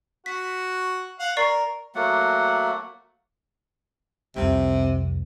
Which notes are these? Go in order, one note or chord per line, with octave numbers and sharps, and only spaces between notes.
F#4 B6
F5 F#5
A#4 D5 C#6 C7
F#3 A3 A#3 F#5
C2 F2 C3